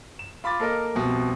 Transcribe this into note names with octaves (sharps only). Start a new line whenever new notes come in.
E7
F4 B5 D6 A6
A#3 A4 A#4 D#5
C2 F2 B2